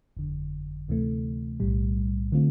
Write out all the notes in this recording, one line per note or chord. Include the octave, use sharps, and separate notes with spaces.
G1 F2 D3
D2 C3 E3 A3
B1 A2 G3
D3 A3 C4 F4